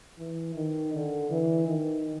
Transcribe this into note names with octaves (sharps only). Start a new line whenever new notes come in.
E3
D#3
D3
E3
D#3